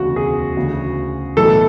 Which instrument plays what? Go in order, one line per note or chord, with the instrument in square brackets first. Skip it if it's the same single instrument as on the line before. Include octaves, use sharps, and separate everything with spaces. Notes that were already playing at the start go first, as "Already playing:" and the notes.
Already playing: [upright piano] E1 D2 C#3 [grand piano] F#4
[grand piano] G#4
[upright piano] D2 C#3 E3
[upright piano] B1 A2 E3 [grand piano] A4